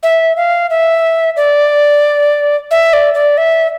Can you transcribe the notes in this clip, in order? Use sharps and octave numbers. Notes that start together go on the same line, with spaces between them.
E5
F5
E5
D5
E5
D5
D5
E5